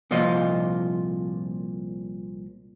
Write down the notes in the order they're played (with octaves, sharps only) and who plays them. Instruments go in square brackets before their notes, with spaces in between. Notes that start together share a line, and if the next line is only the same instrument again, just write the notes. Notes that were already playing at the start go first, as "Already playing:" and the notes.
[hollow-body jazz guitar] C2 A#2 F3 F4 D#5